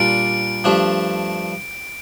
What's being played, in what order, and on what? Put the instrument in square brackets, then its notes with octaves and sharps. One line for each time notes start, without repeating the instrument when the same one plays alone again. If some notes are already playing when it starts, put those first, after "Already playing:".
Already playing: [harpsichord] A#2 G3 D4 F4 [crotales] D7
[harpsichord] G2 F3 A3 D4 G4